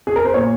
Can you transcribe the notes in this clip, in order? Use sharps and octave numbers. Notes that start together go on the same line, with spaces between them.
G#4
A#4
C5
A#2 C#5